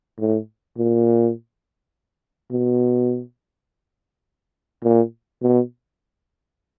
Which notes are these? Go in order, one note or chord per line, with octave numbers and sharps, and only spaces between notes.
A2
A#2
B2
A#2
B2